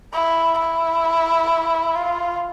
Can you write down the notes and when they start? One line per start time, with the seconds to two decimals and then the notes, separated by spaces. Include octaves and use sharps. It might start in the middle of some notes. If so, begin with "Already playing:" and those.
0.13 E4
0.59 E4
1.96 F4